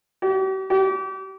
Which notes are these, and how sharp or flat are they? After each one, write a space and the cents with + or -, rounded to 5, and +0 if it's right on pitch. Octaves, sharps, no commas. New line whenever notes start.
G4 -45
G4 -35